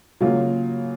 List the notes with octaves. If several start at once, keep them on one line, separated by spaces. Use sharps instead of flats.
C#3 F#3 A#3 F4